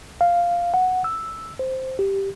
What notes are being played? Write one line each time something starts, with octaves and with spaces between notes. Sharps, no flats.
F5
F#5
E6
C5
G4